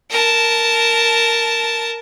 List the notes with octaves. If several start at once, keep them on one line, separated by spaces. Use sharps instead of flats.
A#4 A5